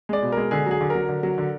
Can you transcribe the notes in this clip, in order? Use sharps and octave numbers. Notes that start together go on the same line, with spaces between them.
G#3 D5
B2
G#3 A#4
D3 G#4
F#3 G#4
D3
F#3 A#4
D3
F#3
D3